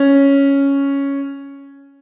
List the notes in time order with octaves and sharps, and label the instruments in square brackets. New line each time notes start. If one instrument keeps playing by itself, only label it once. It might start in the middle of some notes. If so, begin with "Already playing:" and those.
Already playing: [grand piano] C#4